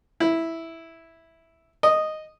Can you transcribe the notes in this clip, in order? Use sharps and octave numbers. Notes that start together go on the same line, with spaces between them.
E4
D#5